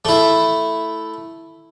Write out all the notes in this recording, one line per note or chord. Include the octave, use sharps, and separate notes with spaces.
A3 E4